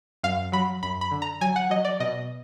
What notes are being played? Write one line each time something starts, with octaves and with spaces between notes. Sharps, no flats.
F#2 F5
F#3 B5
F#2 B5
B5
D3
A#5
F#3 G#5
F#5
F#3 D#5
D5
B2 D#5